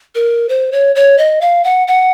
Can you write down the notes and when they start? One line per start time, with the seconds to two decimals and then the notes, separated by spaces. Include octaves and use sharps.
0.15 A#4
0.49 C5
0.72 C#5
0.95 C#5
1.18 D#5
1.41 F5
1.64 F#5
1.88 F#5